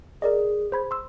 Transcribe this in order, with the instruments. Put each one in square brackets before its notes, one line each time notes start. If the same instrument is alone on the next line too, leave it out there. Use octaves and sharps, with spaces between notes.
[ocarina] G#4 [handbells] A#4 D5 D#5
[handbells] C5 B5 G#6
C6 E6